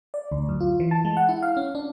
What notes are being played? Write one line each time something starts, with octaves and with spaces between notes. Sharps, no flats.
D5
D2
F#2
F4
E3
A5
G#3
F#5
E4
F5
C#4
D4